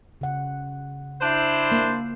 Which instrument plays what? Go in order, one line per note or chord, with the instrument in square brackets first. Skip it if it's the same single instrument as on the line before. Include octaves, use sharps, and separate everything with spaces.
[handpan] C#3 F#5
[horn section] D4 E4 C5
[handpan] A#3